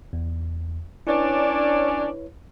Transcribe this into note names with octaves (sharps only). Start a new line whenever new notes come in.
E2
C#4 D4 E4 B4 C#5